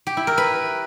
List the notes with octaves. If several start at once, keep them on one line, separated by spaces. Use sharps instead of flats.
G4
E4
A#4
B4